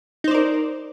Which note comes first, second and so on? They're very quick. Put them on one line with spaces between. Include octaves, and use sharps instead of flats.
D#4 C5 D5 A#4